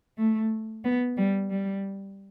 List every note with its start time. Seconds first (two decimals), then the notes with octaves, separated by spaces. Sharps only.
0.18 A3
0.84 B3
1.16 G3
1.49 G3